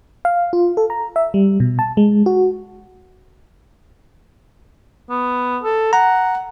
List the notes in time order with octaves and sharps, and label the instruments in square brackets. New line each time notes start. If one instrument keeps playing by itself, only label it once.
[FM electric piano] F5
F4
A4
A#5
E5
G3
B2
A5
G#3
F#4
[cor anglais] B3
A4
[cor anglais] F#5 [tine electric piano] A#5